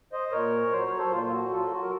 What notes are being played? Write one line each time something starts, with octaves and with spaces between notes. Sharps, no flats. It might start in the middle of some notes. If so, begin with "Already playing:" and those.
C5 D#5
A#2 A#4 C#5
F#3 C5
C#5
A4 C5
A#2 F4
F4
F#4
F#3 F4 A4
F#4
A#4